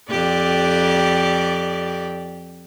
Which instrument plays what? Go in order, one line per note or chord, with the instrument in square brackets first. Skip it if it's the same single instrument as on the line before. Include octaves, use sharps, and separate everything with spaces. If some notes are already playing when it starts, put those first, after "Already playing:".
[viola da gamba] F2 G4 D5